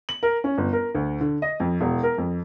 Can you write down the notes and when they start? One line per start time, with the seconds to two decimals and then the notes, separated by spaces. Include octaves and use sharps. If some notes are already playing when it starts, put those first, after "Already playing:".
0.09 F#7
0.23 A#4
0.44 C#4
0.58 G1
0.73 A#4
0.95 D2
1.20 D3
1.42 D#5
1.60 F2
1.81 E1
2.03 A#4
2.18 F2